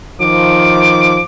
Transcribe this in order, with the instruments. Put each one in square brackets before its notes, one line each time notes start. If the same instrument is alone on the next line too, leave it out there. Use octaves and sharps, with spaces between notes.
[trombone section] D#3 F3 [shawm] D6